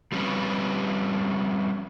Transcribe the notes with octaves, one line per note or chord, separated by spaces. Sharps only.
F3 G3 C4 C#4 B4